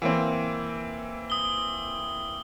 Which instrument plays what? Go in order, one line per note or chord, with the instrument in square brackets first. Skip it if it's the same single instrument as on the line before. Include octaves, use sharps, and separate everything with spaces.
[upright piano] E3 A#3 C4
[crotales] D#6 G7